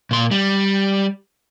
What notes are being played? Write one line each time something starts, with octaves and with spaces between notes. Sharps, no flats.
A#2 C6
G3